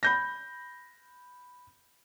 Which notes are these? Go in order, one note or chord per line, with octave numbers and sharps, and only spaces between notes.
B5 G6 A#6